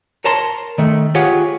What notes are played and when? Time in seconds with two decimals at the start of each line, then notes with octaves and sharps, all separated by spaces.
0.24 A#4 C#5 A5 A#5 C6
0.78 D#3 A3
1.15 F4 G4 G#4 C#5 F#5